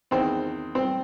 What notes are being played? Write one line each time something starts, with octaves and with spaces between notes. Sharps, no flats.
E2 D#3 C4 C5
C4 C5